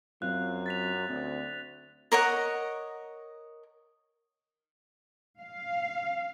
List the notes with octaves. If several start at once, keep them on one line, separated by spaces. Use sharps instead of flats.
F#2 F#3 C4 F4 F#6
A6 B6 F7
D2 C4
A#4 C#5 D#5 F#5
F5